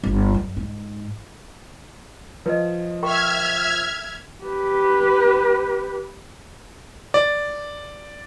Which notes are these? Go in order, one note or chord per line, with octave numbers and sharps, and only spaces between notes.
G1
F#2
G#2
F3 B4 D#5
A#4 E5 G5 C#6 F6 G#6
G4 B4
D5